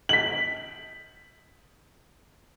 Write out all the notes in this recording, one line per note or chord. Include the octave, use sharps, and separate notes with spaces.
B6 F#7